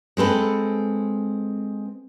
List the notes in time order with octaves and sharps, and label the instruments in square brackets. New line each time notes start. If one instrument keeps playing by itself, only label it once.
[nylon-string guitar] G#3 C4 A4 B4